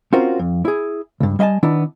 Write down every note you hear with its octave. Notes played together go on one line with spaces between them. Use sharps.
C4 C#4 F4 F#4 A#4 C5
F2
E4 G#4
C#2 G2
G3 D#5 E5 G#5 A5
D#3 B3 D4 E4